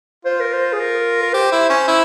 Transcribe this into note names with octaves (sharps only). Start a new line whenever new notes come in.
F4 C5
A#4
C5
G#4
A#4
A#4
G4 C5
E4
C#4
E4